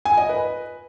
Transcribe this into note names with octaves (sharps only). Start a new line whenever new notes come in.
G#5
D#5
B4